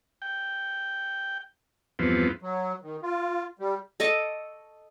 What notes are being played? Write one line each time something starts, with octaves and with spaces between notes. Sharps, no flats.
G5
E2 G2 F3 B3 C4
F#3
D#3
F4
G3
A4 D#5 C#6 D6